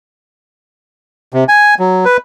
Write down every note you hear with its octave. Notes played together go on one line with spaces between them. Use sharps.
C3
G#5
F#3
B4